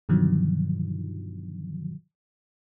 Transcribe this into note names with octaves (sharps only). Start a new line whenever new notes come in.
G2 B2 D3 D#3 F3 F#3